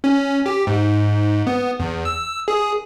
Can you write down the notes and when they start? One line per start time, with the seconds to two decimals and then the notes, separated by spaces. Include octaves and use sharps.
0.04 C#4
0.46 G4
0.67 G#2
1.47 B3
1.80 E2
2.05 E6
2.48 G#4